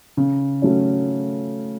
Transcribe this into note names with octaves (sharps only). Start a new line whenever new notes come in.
C#3
F#3 A3 C#4